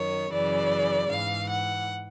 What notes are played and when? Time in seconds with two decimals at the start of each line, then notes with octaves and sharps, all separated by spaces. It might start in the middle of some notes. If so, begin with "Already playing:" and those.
Already playing: F#2 D#3 C#5
0.32 F#2 C#3 E3 D5
1.10 G#2 E3 F5
1.49 F#5